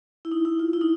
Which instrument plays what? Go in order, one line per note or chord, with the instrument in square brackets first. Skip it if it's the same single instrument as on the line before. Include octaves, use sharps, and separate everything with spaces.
[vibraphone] E4
D#4
E4
F4
E4
D#4